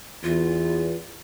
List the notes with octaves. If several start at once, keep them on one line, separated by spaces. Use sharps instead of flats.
E2 F4